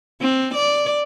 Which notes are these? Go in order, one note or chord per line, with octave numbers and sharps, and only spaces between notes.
C4
D5